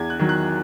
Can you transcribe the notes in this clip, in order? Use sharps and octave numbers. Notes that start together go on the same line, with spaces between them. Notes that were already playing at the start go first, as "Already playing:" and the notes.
Already playing: E2 G#6
F#6
D#3 F#3
F#6